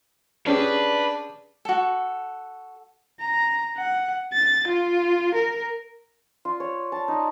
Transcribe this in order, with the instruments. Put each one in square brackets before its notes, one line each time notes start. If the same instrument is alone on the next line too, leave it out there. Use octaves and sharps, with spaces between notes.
[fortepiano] C#4 G4 G#4 [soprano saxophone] D4 [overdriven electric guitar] B4
[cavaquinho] F#4 A4
[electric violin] A#5
F#5
A6
F4
A#4
[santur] F4
C#5
A5
D#4